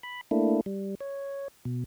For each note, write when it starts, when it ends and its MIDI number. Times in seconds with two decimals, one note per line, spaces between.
0.03 0.21 83
0.31 0.61 57
0.31 0.61 58
0.31 0.61 62
0.31 0.61 64
0.66 0.95 55
1.01 1.48 73
1.65 1.84 47